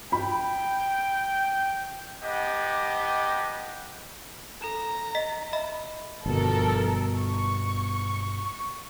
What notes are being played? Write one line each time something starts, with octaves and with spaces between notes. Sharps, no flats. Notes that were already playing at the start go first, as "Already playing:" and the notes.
G5 B5
B3 D4 G4 D#5
A4 A#5 E7
D#5 B6
D#5 E5 B5
G1 B2 F3 A4 A#4
C#6